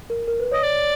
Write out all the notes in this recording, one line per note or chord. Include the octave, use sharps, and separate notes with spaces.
A#4
A#4
B4
C#5 D#5
D5